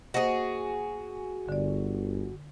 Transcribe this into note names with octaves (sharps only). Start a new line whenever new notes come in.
A#3 F#4 G#4 C5 D#5
G1 D3 D5